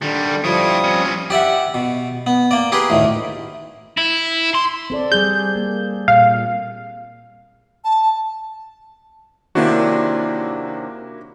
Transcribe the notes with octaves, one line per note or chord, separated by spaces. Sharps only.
D3 D#3 G3
F3 G3 E4 C#5 D#6
C4 C#4
G4 D5 E5 F#5
B2
B3
A#3 D5
G4 G#4 A#4 B4 C6
D2 A2 D#3
E4
C6
C4 A4 D5
G3 G#4 G6
A#3
A#2 F5
A5
D#2 C3 A#3 D4 E4 F#4